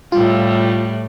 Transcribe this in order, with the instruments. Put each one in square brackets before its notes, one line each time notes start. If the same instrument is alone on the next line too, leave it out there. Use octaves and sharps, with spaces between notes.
[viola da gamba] A2 G3 [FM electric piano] F4